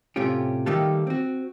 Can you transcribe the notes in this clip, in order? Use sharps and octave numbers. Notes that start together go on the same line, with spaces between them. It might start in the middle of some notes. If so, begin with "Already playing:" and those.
A2 C3 A3 C#4 F4 G4
D#3 G3 A3 A#3 G4 A4
C4 F#4